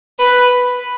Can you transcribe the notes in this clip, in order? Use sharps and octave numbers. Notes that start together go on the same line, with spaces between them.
B4